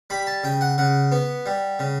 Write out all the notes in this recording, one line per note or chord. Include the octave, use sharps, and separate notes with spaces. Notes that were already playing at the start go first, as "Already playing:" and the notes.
G3 B5
A5
C#3 G5
F#5
C#3 F#5
B3
G3
C#3